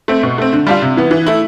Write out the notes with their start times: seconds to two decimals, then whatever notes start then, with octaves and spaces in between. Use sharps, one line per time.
0.08 A3 C4
0.23 B2
0.38 A3 C4
0.53 D3
0.67 G3 D4 F4
0.82 C3
0.97 E3 B3
1.11 E3
1.26 A3 E4